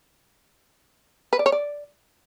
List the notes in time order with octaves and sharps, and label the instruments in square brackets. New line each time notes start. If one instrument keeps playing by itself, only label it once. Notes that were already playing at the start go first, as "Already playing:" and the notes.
[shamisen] B4
D5
C#5
D5